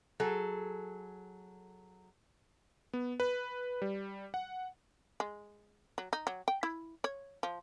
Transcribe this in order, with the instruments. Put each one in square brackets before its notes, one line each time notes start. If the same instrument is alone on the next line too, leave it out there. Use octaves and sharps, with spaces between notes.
[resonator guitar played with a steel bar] F#3 G#4 A4
[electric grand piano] B3
B4
G3
F#5
[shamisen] G#3
F#3
D#4
F#3
G5
E4
C#5
F3